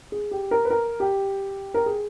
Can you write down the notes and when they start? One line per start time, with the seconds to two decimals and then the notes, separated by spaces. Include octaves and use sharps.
0.12 G#4
0.31 G4
0.51 A#4
0.65 B4
0.70 A#4
1.00 G4
1.74 A#4
1.86 G#4